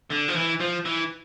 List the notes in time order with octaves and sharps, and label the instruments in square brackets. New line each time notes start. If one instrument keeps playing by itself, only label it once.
[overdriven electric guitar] D3
F3
E3
F3
E3